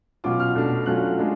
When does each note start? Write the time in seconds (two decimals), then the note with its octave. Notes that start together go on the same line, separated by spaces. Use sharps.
0.24 B2 F#3 C#4 F4 D6
0.40 F6
0.55 B2 A3 D4
0.86 F#3 A3 C#4 F4 F#6
1.17 G#3 D4 F4